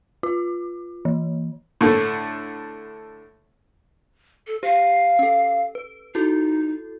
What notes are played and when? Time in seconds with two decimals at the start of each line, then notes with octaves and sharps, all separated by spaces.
0.23 F4
1.05 E3
1.81 A2 D3 A3
4.47 A4
4.63 G4 C5 F5
5.19 C#4 A4
5.75 B4
6.15 D#4 E4 F#4 A4